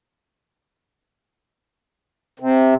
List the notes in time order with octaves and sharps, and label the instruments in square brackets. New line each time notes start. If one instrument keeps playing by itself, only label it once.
[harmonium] C3